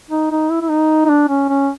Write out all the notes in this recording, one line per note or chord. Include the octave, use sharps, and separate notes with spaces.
D#4
D#4
E4
E4
D#4
D#4
D4
C#4
C#4